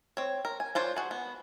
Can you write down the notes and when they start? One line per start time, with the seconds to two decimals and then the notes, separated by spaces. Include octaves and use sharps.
0.17 C4 C#5
0.45 A#4
0.60 G#5
0.75 D4 F4 C5 C#5
0.96 F#4 G#4
1.11 B3